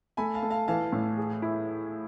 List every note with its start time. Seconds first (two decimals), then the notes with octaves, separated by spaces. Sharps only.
0.17 A3 G#5 B5
0.34 F5 A5
0.43 A3
0.50 F5 A5
0.68 E3 F5 A5
0.93 A2
1.18 G#4
1.42 E4